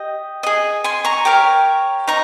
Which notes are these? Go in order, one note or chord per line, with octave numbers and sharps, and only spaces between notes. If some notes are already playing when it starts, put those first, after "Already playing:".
Already playing: G4 D#5
G#4 D#5
G#5 C6
A#5 C#6
G4 A#4 C#5
D#4 A#5 C#6